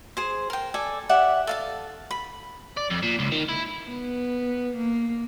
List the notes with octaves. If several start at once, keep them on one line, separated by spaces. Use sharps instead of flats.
G#4 C5
A#4 G5
A4 D5 G#5
G4 D5 E5 F#5
A4 F5 A5
B5
D5
F2
A#2
C#2
D#3
E4
B3
A#3